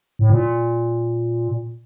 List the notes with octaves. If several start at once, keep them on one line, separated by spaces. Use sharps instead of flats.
A2
A#2